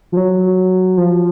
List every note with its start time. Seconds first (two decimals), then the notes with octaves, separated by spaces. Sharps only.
0.12 F3
0.17 F#3
0.97 F3